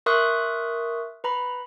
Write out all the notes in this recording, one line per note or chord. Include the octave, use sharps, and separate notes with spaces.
A#4 E5 C6 C#6 D#6 F#6
B4 A#5 B5